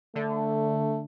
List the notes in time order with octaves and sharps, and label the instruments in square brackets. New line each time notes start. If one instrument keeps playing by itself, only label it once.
[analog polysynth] D3 [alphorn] A3